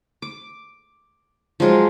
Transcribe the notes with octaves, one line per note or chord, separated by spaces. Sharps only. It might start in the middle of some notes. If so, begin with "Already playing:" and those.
D6
F3 F#3 G#3 F4